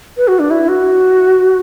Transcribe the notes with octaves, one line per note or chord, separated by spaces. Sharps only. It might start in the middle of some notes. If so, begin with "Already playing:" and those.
B4
F#4
D4
E4
F#4